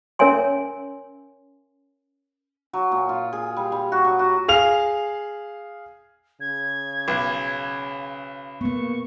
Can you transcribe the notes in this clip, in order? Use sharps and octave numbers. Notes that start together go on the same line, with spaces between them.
C#4 A#4 C#5 E5 G#5 C6
F#3
A#2
F4
G#4
G3
G3
F#4
F#3
F#4
G#4 F5 F7
C#3 G#6
B1
A#3 B3 C#6